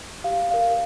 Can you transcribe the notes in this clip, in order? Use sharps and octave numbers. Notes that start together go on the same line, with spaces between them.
G4 F5
A#4 D5 F5